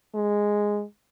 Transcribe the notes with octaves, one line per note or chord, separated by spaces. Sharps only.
G#3